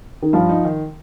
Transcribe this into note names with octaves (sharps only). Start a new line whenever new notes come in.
D#3
G2 F3
D#4
D#3